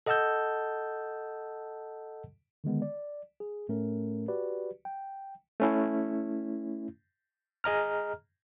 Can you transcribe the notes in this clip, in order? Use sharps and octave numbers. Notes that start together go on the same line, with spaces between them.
A4 D#5 F#5 A5 E6 G6
D3 D#3 G#3 B3
D5
G#4
A2 A3 C#4 A#4
F#4 G4 B4 D5
G5
A3 C#4 E4
G#4 D#5 A#5 F6